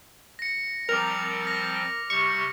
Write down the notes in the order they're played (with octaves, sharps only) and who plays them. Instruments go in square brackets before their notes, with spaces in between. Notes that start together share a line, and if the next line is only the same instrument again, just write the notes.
[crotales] A#6 C#7
[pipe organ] F3 G3 C4 [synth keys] A#4 [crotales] D6 F7
[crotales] F6 A#6
[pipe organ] C3 G3 G4 [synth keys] C#6 [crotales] C#7